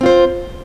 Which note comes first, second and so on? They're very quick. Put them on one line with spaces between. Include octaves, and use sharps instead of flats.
C4 F4 C5